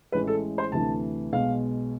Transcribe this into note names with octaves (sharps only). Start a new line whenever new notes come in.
A1 A2 G#3 B4
A4
C5
D2 C3 E3 A3 A5
B1 B2 G#3 F5